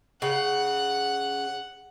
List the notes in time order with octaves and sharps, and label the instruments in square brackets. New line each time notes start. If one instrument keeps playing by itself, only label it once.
[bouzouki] C#3 [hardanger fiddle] F#5